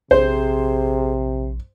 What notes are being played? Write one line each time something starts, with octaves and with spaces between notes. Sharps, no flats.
A#1 C3 G#4 C5